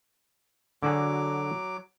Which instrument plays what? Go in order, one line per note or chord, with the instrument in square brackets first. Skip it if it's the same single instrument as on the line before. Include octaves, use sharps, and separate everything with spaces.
[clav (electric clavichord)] D3 F#4 G#4 [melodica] F#3 D6